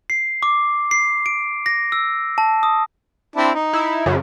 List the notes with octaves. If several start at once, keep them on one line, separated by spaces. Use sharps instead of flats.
C7
D6
C7
D7
A#6
E6
A5
D#6
C4 D4 E4
D#4
E4
F#2 C#3